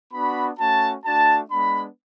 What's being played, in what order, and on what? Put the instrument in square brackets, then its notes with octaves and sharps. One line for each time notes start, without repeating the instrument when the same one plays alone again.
[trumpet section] B3 D4 F#4 B5
A3 C#4 F#4 A5
A3 D4 F#4 A5
G#3 B3 D4 B5